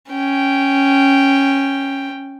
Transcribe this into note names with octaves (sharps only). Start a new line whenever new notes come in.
C#4 G5